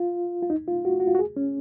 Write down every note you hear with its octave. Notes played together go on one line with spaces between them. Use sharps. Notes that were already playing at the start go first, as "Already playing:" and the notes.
Already playing: F4
F4
D#4
F4
F#4
F#4
F4
F#4
G#4
C#4